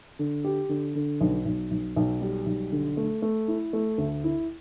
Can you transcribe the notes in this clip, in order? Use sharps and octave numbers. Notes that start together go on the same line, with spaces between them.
D3
G4
D3
D3
B1
B1
B1
B1
G3
B1
D3
A3
A3
E4
A3
D2
E4